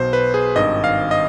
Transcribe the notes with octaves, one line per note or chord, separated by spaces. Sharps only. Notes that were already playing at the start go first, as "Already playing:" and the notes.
Already playing: B1 B2 C5
B4
G#4
G#1 G2 D#3 D#5
F5
D#5